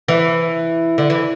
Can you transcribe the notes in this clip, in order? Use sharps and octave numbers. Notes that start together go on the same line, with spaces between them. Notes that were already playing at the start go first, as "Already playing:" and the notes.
E3
D3
E3